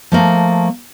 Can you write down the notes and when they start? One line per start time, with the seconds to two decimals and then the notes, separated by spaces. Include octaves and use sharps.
0.12 F3 A3 A#3